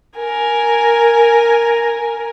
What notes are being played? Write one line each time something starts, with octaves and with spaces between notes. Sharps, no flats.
A#4 G#5